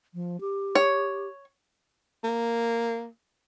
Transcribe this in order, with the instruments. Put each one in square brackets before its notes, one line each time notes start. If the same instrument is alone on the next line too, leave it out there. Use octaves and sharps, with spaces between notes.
[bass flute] F3
G4
[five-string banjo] C#5
[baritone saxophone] A#3